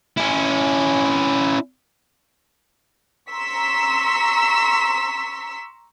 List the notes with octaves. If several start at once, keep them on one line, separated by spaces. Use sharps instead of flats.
C#4 E4
A#5 C6 C#6 E6 B6